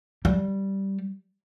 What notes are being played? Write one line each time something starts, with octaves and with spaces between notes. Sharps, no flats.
G3